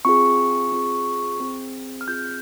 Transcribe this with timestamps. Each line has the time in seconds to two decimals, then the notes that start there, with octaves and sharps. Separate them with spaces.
0.05 C4 F4 G#4 C#6
0.72 C4 F4 G#4
1.40 C4 F4 G#4
2.01 F6
2.07 C4 F4 G#4 G6